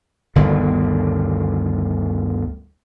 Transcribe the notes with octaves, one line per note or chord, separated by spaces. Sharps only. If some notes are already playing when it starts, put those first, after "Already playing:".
G1 D2 D3 D#3